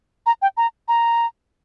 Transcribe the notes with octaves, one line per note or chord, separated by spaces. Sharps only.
A#5
G5
A#5
A#5